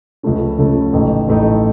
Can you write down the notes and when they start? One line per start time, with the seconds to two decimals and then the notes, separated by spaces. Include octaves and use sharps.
0.23 C#2 C#3 F3 A3 C#4
0.58 C#2 C#3 F3 A3 C#4
0.93 A1 A2 A3 D#4
1.28 A1 A2 A3 D#4